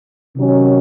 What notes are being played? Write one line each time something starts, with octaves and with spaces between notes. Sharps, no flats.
C3 D#3 F#3 C#4